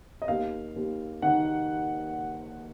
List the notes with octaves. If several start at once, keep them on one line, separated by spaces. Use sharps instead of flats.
D#5
D#2 F5
D#2
D#3 F#5